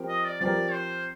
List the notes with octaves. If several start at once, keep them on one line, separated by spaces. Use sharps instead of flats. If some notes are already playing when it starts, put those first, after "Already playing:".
Already playing: F3 C4 G4 A#4
D#5
D5
F3 C4 G4 A#4 D5
C5